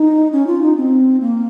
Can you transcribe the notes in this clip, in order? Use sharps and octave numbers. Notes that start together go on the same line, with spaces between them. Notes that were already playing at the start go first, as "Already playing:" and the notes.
Already playing: D#4
C#4
F4
D#4
C4
A#3